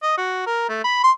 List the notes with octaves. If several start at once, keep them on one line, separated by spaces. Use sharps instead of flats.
D#5
F#4
A#4
A3
B5
C6